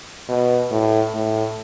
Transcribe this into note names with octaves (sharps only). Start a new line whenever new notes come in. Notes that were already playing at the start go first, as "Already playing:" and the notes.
B2
A2
A2